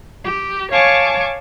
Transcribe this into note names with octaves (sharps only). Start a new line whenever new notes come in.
G4
C#5 F5 G#5 A5 C#6 D6